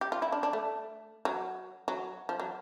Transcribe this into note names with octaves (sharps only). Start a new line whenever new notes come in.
G4
F4
E4
D4
D4
A3
F#3
F#3
F3
F#3